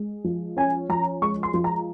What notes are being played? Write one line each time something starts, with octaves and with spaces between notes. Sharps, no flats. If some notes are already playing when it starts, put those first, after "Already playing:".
Already playing: G#3
F3
C#4 G#5
F3 A#5
G#3 C#6
C6
F3
A#5